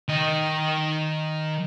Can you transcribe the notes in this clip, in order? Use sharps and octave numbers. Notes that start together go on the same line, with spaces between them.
D#3 D#5